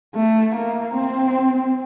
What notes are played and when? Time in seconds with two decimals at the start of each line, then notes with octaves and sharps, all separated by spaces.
0.15 A3
0.55 A#3
0.94 C4